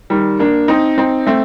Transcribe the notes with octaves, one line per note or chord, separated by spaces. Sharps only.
D#3 G3
A#3 D4
C4 D#4
C4 D#4
A3 C4